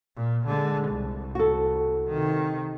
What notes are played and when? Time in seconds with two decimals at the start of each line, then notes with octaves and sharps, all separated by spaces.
0.17 A#2
0.47 D3 G#3
0.88 C2
1.35 F#4 A4
2.09 C3 D#3